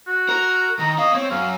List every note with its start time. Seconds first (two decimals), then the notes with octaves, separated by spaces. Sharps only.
0.07 F#4
0.29 A#4
0.79 D#3 A#5
0.98 C4 D#5 F5
1.14 C4 C#5
1.31 F#2 F5